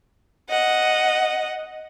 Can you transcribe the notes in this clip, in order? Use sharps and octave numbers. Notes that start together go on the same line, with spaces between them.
D#5 F#5